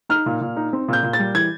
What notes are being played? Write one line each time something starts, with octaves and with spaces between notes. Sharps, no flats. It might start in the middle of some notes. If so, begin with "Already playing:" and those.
D#4 F6
A#2
A#2
D#4
C4
A#2 G6
A#2
A6
G3
E3 G#6